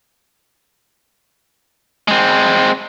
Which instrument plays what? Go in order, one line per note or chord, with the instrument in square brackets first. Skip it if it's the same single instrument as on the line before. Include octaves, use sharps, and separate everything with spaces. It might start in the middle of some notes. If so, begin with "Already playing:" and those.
[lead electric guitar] G#3 C4